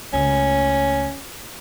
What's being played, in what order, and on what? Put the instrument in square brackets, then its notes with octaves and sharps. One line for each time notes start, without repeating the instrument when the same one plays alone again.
[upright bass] C#2 A3 [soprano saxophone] C#4